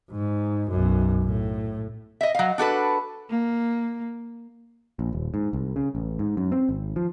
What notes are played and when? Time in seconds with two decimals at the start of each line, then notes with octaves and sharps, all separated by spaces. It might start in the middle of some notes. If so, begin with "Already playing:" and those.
0.11 G#2
0.71 B1 F#2
1.23 A2
2.21 D#5 E5
2.35 F#3 F5
2.58 D4 F#4 A4 B4
3.30 A#3
4.99 A#1
5.12 D#1
5.34 G#2
5.53 C2
5.76 C#3
5.95 A1
6.19 G#2
6.37 F#2
6.52 C4
6.69 G#1
6.96 F3